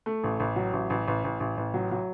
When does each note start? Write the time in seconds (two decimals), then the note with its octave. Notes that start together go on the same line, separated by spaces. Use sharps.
0.06 A3
0.24 A1
0.40 A1
0.56 F#3
0.73 A1
0.90 A1
1.08 A1
1.24 A1
1.40 A1
1.57 A1
1.74 F#3
1.91 F#3